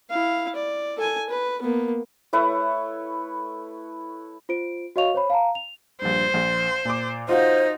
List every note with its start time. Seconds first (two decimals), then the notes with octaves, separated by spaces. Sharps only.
0.10 E4 F5
0.56 D5
0.97 A4 G#5
1.30 B4
1.62 A#3 B3
2.33 A3 E4 B4 C#5
4.49 F4 C5 D7
4.96 F#4 C#5 D#5 F5 C#6 F7
5.14 C5 C#5 B5
5.30 F5 A5 A#5
5.55 F7
6.02 A#1 G2 C5
6.34 A#1
6.85 A#2 D6
7.29 D#4 F4 F#4 C5 F5